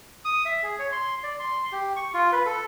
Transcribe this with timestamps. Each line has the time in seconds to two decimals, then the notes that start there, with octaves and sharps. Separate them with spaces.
0.25 D#6
0.45 E5
0.63 G#4
0.79 C#5
0.92 C6
1.23 D5
1.39 C6
1.72 G4
1.96 C#6
2.14 F4
2.32 B4
2.46 A4